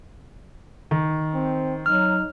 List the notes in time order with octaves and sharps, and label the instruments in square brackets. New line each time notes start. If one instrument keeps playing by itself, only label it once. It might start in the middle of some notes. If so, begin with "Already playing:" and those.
[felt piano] D#3
[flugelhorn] C4
[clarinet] F#3 [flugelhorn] D#4 [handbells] F6